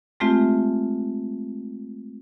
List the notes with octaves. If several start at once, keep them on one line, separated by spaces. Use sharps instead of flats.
G#3 A3 C4 F4 G4 E5